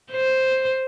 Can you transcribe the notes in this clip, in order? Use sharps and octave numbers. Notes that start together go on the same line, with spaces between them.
C5